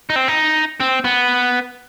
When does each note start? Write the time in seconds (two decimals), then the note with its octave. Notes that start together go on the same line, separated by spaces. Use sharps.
0.10 D#4
0.16 C4
0.28 D#4
0.80 C4
1.04 B3